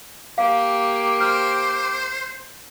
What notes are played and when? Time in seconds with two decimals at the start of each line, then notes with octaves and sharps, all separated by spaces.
0.38 A#3 G4 F5 D6
1.21 C5 F6